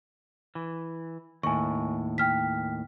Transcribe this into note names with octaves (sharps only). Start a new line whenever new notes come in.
E3
D#2 A2 G#5 C#6
G5 F6 B6